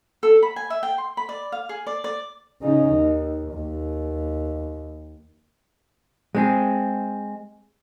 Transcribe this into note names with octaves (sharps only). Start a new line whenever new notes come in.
A4
B5
G#5
E5
G5
C6
B5
D5
F5
G#4
D5
D5
C#3 D#4
D#2
D#2
G#3 C4 G#4